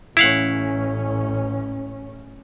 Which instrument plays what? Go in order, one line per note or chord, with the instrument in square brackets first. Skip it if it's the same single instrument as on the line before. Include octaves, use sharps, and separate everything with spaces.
[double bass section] A1 C#4 [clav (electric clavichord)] E4 F5 F#5